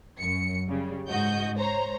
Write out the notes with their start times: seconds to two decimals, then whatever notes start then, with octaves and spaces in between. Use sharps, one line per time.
0.20 F#2 C#7
0.68 C#3 G3
1.09 G#2 F#4 D#5 G6
1.58 C5 C#5 A#5